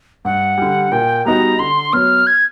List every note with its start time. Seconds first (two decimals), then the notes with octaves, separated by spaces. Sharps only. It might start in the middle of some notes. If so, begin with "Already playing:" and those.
0.25 G2 F#5
0.58 D3 G3
0.92 A#2 G5
1.25 G3 B3 D#4 F#4 A#5
1.59 D3 C6
1.93 F#3 B3 F6
2.27 G#6